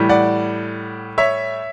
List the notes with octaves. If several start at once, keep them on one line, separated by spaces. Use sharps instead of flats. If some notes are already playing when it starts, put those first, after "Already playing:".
Already playing: A2 E3 G3
D5 F#5
C#5 E5